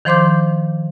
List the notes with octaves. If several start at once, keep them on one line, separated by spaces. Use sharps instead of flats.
D#3 F3 C5 C6 D6 G6